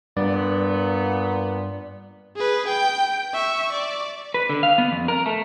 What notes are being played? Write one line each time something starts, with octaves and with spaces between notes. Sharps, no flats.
G2 A#2 B3 D5
G#4 B4
G5
E5 C#6
D5
B4
D3
F5
B3
F2
A#4
A3